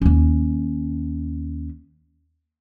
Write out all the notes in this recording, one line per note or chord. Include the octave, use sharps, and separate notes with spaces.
D#2 C#4